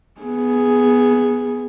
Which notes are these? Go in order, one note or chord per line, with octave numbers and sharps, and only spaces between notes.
B3 G#4